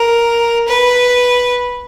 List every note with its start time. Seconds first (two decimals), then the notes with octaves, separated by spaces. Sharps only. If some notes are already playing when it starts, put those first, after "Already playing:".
Already playing: A#4
0.68 B4